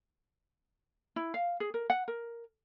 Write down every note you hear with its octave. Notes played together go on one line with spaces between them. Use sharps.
E4
F5
G#4
A#4
F#5
A#4